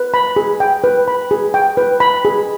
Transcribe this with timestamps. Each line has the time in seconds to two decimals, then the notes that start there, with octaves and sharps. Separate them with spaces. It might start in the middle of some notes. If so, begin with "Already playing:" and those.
Already playing: B4
0.14 B5
0.36 G#4
0.60 G5
0.84 B4
1.08 B5
1.31 G#4
1.54 G5
1.77 B4
2.00 B5
2.25 G#4